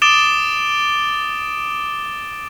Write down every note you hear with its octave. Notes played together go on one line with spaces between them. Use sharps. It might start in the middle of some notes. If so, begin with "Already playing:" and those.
D6 D#6 A6 D7 E7 G7